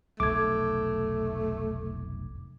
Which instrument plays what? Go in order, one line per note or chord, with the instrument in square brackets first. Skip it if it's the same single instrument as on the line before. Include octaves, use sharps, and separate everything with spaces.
[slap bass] F1 B1 [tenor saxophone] A3 [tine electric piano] D6 G#6